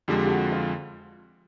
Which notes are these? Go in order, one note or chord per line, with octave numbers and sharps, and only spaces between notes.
F2 D3 F3 G#3 G4
G4
F#4
F4